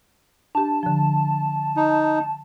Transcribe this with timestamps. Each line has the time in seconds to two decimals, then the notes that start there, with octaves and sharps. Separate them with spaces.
0.55 D4 G4 A5
0.83 D3 F3
1.76 D#4